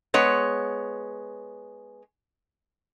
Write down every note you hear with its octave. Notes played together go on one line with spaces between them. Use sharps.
G#3 B3 C#5